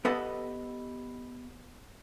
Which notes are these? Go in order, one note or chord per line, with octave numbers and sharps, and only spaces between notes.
B3 G4 A4 B4 D#5 F#5